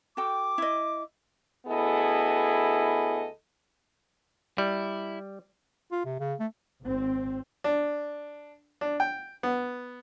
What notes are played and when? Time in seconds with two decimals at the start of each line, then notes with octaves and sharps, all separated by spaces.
0.17 F#4 A4 G5 D6
0.58 E4 D#5
1.67 D2 B3 E4 G#4 A4 D#5
4.58 G3 E4
5.92 F4
6.05 C3
6.20 C#3
6.39 A3
6.83 G#1 C4
7.64 D4
8.81 D4
9.00 G5
9.43 B3